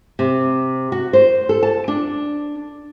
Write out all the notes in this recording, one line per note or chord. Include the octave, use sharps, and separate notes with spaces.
C3
F#4
C5
A4
A5
D4